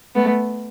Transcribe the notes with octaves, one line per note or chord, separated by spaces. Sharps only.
A3 B3